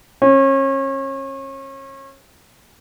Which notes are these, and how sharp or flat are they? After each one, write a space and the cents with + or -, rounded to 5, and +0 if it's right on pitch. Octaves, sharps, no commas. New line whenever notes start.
C#4 -35